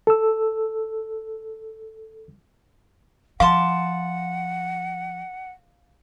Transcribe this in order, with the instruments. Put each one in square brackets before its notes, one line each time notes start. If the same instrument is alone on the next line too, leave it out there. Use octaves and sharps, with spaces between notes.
[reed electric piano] A4 E6
[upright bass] F3 [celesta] F5 [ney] F#5 [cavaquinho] A5 C6 D6